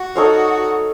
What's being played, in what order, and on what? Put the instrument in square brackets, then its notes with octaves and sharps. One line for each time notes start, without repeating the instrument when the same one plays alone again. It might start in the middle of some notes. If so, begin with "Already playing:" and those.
Already playing: [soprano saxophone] F#4
[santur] D#4 A4 C#5 F5